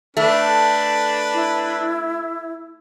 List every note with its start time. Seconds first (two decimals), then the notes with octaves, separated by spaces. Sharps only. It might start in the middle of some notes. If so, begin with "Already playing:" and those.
0.17 A3 D4 B4
1.34 E4